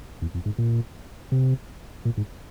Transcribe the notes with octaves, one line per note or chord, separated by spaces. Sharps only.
E2
F2
G#2
A#2
C3
A#2
G#2